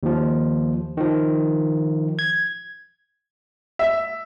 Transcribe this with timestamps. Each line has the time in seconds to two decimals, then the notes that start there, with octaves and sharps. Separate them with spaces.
0.03 D#2 F3
0.97 D#3 F3
2.19 G#6
3.79 E5